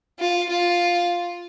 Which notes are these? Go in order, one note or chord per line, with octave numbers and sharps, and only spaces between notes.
F4
F4